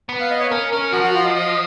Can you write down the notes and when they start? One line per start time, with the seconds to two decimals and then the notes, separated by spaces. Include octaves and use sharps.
0.09 B3
0.20 F5
0.30 D#5
0.40 C#5
0.51 C#4 A#4
0.72 C#4 A#4
0.92 F3 F#4
1.03 F#4
1.14 F4
1.24 D#5
1.35 D#5